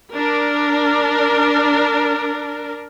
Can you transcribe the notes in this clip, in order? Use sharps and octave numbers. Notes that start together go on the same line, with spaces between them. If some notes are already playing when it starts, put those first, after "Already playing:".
D4 A#4